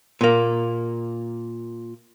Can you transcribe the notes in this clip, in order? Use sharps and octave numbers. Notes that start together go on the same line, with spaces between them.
A#2 A#3